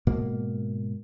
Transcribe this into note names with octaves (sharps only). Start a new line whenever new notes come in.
G#2 B2 A#3